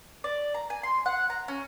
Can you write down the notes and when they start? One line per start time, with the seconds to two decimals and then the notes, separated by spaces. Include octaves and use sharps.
0.24 D5
0.55 A#5
0.70 G#5
0.83 C6
1.06 F#5
1.30 A#5
1.48 C#4